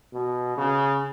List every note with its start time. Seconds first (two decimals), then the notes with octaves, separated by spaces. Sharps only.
0.13 B2
0.57 C#3